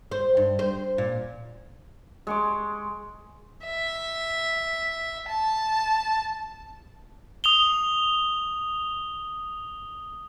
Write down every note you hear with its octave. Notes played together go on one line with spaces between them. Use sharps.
C5
G2
C5
A#2
G#3 C#6 D6
E5
A5
D#6 F7 G7